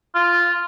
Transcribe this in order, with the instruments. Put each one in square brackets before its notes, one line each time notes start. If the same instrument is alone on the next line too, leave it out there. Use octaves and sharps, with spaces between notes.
[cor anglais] F4